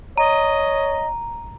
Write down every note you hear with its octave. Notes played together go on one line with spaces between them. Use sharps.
C#5 D#5 A#5